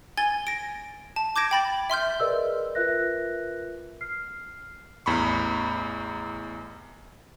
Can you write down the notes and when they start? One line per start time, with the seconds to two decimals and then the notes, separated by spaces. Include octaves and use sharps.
0.17 G#5 G#6 A6 G7
0.47 A#6 D7
1.16 A5
1.36 D6 G6 G#6 A#6 D7
1.51 G5 B5 A6
1.90 E5 C6 F6 G6
2.20 G#4 A#4 B4 D5 D#5 E6
2.75 F4 A#4 B4 E5 F#6 A#6
4.01 F6 C7
5.06 A1 E2 B5 C#6